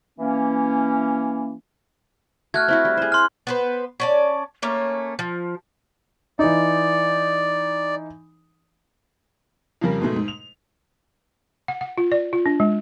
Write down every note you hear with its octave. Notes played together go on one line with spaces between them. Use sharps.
E3 A#3 C#4
A3 F#4 F6 F#6 G#6
C4 E4 F#4
G3
G#4 C5
C6 F6
B3 B4 C5
C#4 D5 A5
A3 A#3 C#4
F3
E3 D#4 D5
F2 C#3 G3 A#4
G#2 B2 G#3 A3
G#2
F7
F#5
F#5
F4
D5
F4
D4
G#3